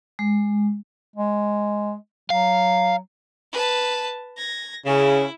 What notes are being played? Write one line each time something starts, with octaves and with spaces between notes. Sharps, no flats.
G#3
G#3
F#3 F5
B4 A5
G#6 A#6
C#3 E4